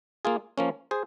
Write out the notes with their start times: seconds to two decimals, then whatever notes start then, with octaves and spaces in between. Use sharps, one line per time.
0.25 A#3 F4 G#4
0.58 F3 A#3 C#4
0.91 G#4 C5